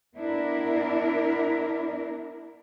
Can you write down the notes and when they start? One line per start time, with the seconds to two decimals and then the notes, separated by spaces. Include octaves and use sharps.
0.15 B3 D4 E4 A#4